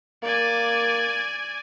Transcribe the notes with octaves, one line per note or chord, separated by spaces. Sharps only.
A#3 D5 G#5